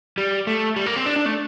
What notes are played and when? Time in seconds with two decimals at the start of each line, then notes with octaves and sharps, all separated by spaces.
0.18 G3
0.47 A3
0.76 G3
0.86 A#3
0.96 C4
1.06 D4
1.16 D4
1.26 A3